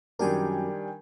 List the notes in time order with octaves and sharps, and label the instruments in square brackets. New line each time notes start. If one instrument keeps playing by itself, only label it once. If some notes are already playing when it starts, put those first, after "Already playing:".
[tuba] F#2 [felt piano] D#3 G3 D4 [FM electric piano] A#4 G5 G#5